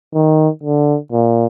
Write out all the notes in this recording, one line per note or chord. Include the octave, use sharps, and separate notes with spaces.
D#3
D3
A#2